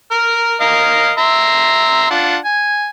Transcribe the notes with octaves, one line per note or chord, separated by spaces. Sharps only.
A#4 F6
A#4 D#5 F5
E5 A#5 C6
D4 F4 F#5
G#5